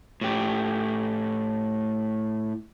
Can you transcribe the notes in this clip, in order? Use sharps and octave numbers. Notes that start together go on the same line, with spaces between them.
A2 G4